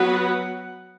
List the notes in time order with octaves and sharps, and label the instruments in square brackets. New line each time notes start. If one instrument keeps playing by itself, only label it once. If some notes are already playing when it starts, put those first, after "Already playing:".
Already playing: [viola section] F#3 B3 F#4 B4 [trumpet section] F#5